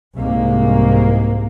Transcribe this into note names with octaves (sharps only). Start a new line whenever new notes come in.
C2 G#2 A#3